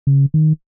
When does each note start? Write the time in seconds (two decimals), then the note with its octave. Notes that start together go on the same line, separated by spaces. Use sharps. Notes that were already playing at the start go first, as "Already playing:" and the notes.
0.07 C#3
0.34 D#3